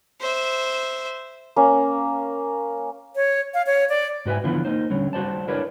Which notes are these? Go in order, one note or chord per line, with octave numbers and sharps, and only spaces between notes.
C5 E5
A#3 C#4
C#5
F5
C#5
D5
G#2 F#4 B4 E5 G#5
D3 E3 F3 B3 E4 F4
A#3 D#4 C5
D3 G3 C#4
G3 F#4 C5 D5 A5
D4 E4 A#4 B4 C#5 D5